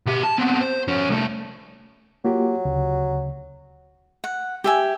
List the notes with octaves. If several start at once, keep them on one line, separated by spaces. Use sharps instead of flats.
B2 G4
A5
B3 C4
C5
F2 C#4
C2 A3
F#3 A#3 F4 G4
D2 C#3
F#5
G4 E5 G#5